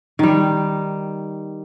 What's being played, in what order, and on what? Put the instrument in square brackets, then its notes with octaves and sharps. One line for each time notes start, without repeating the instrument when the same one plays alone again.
[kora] D#3 G3